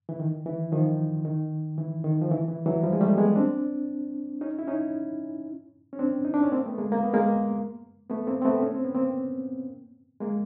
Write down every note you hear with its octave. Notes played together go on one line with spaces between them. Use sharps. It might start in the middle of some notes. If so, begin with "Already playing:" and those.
E3
D#3
E3
D#3 F3
D#3
E3
D#3
F3
E3
E3
E3 F#3
F3 G3
G#3
G3 A3
B3
G#3 A#3
C4 D4
C#4 D#4
E4
C#4 D#4
C#4
C4 D4
D#4
D4
C#4
A#3 C4
A3 B3
G#3 A#3
A#3
B3
G#3 A#3
A3 B3
A#3 C4
C4
A3 B3
C#4
C4
B3
A#3 C4
G#3 A#3